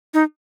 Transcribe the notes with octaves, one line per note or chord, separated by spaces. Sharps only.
D#4